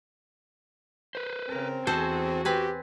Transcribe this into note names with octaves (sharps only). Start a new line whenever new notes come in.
B4 C5
C#3 C4 A#4
E2 F#4 G#4 A4 C5 D#5
C4 G4 B4 G#5